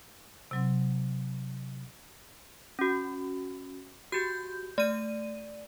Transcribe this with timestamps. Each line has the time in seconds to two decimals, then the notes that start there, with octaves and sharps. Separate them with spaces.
0.51 C3 F#3 C4
2.79 C#4 F#4
4.12 F#4 G4 G6
4.78 A3 D5 D#7